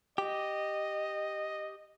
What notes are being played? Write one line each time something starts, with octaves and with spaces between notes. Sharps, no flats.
G4 D#5